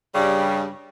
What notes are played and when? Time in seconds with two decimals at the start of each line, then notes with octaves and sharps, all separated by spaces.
0.15 G2 C#3 G3